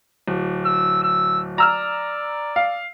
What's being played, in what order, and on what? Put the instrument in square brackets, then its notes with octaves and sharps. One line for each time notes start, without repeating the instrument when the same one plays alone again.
[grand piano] D1
[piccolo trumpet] E6
E6
[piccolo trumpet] D5 [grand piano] A#5 E6 F6
[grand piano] F5